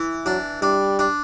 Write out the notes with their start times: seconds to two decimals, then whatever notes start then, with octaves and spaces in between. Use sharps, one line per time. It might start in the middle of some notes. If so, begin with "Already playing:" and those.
Already playing: E3
0.26 F#3 D4
0.62 G3 D4
0.99 D4